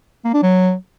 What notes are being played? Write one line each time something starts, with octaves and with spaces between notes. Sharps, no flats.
A#3
D4
F#3